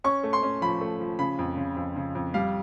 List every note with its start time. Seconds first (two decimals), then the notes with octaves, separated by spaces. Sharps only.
0.04 C#4 C#6
0.23 A3
0.33 C6
0.43 C#4
0.61 F3 B5
0.81 A3
1.00 F3
1.19 C#3 B5
1.39 F2
1.57 C#3
1.77 F2
1.96 C#3
2.15 F2
2.34 G3 F5